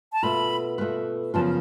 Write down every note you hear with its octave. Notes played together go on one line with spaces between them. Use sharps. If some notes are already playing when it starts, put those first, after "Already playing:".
A5
B2 A3 F4 B4 B5
B2 A3 F4 B4
F#2 C#3 F3 B3 F4 A5